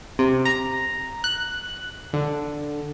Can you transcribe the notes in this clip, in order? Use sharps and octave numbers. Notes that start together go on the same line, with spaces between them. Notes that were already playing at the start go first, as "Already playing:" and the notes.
C3
A#5
F#6
D3